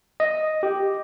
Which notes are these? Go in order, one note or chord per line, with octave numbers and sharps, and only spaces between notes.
D#5
G4